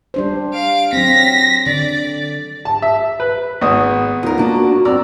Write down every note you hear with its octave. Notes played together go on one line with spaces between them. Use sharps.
G3 D4 C5
F5 D7
F#3 C4 A#6 B6
D3 D5
A5
E5
B4
G#1 B3 D#6
D2 D#4 F4 A#4
A#3 D4 F#4
F#2 C4 D5 A#5 E6